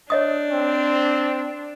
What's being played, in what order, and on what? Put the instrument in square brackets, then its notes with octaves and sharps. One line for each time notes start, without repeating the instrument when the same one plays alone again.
[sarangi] D4 [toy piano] C#5 D#5 D#6
[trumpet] C4